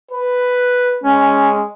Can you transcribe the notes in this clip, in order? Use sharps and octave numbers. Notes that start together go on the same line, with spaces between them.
B4
G#3 C#4